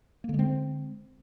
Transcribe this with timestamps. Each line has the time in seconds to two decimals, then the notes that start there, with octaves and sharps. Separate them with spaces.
0.24 A#3
0.29 D3
0.34 G#3
0.39 C4